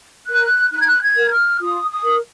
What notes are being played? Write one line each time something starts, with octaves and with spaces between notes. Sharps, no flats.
A#4 F#6
D#4 F#6
G#6
F#6
G#6
A#4
F6
F4 D#6
D#6
A#4